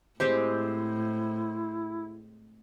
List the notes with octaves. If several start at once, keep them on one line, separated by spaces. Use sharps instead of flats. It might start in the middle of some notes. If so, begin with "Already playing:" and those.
A2 G#3 C4 E4 G4 C5